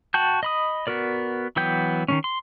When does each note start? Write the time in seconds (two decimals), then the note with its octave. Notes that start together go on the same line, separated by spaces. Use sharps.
0.14 F#4 G5 A5 G6
0.43 D#5 B5 D#6
0.87 B3 F#4 A#4 D5
1.56 E3 F#3 B3 G5 G6
2.08 D#3 A3 C#4
2.24 C6